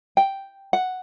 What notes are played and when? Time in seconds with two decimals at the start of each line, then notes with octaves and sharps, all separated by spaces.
0.17 G5
0.73 F#5